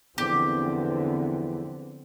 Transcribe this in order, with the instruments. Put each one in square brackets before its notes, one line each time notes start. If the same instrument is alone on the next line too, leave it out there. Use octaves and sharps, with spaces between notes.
[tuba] E2 [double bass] D3 [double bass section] F3 B3 C4 [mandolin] G4